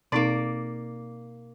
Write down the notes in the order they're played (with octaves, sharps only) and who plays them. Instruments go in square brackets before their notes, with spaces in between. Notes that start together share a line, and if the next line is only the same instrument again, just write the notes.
[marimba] B2 C4 D#4 [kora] A#3 D5